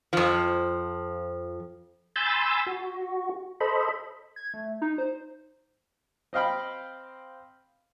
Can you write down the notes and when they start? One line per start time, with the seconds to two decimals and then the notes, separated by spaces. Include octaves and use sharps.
0.13 F2 F3
2.16 G#5 B5 C6 E6 G6 A6
2.66 F#4
3.60 A4 C5 D#5 B5
4.36 G#6
4.54 A3
4.82 D#4
4.98 C5
6.33 C4 D#5 F5 G5 B5